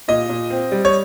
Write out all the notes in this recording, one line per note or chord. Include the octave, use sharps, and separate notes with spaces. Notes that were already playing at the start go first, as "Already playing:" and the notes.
A#2 D#5
A#2
C4
G3
C#5